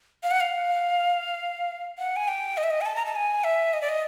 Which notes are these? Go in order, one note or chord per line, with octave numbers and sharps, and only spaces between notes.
F5
F#5
F5
F#5
G#5
G5
D#5
E5
D#5
G#5
A5
A#5
A5
G#5
E5
D#5
D5
D#5